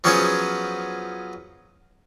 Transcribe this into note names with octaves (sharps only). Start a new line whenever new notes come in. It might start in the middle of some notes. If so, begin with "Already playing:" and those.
F3 F#3 B3 C#4 G#4 C5